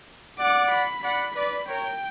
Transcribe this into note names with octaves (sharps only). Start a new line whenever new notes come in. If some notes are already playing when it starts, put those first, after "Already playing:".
D5 F#5 D6
B5
D5 F#5 B5
B4 D5 B5
A#4 C#5 G5